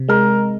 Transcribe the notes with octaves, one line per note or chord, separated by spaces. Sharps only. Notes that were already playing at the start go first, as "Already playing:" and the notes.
Already playing: C3
G#3 A#4